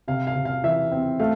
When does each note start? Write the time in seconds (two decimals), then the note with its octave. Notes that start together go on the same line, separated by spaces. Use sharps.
0.08 C3 F5
0.27 F5
0.36 C3
0.45 F5
0.63 E3 E5
0.92 C4
1.19 A3 F5